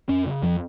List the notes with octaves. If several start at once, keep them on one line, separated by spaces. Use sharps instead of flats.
F2 C#4
C#3
F2 F3